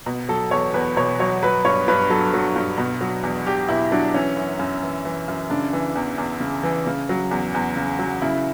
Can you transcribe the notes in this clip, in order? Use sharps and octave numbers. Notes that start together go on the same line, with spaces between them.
B2
F#3 A4
E2 C#5
E2 B4
B2 C#5
F#3 C#5
F#3 B4
G2 C#5
G2 B4
F#3 A4
F#3
G2
B2
F#3
E2
E2 G4
B2 E4
F#3 D4
E3 C#4
F#2
F#2
E3
E3
F#2
C#3 D4
E3
E2
E2
C#3
E3
C#3
F#3
E2
E2
C#3
F#3
C#3 E4